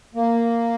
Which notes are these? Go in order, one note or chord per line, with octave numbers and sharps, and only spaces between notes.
A#3